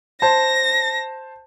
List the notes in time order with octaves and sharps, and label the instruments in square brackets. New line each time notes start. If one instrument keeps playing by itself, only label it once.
[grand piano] C5 A5 [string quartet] A#6